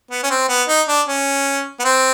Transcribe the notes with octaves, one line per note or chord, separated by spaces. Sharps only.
B3
C#4
C4
B3
D#4
D4
C#4
B3
C4